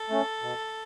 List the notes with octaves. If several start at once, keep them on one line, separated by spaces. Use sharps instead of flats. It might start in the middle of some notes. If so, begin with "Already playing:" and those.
Already playing: A4
A3 C#4
B2